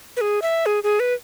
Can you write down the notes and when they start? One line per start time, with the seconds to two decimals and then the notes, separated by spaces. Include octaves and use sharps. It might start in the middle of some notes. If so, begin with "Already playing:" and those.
0.17 B4
0.21 G#4
0.42 E5
0.66 G#4
0.84 G#4
1.00 B4